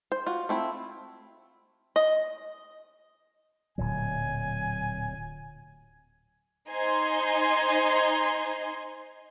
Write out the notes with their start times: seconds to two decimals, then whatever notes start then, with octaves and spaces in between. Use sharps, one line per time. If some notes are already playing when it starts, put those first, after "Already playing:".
0.12 C5
0.26 F4 F#4
0.49 A3 C4 E4
1.96 D#5
3.78 D1 A#2 F#3 G#5
6.69 D#4 C5 G#5 C6 G#6